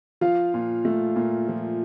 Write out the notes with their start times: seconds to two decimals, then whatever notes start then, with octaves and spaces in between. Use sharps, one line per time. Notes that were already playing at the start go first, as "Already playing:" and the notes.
0.21 F3 F4 F5
0.54 A#2
0.85 A3
1.16 A#2
1.48 F3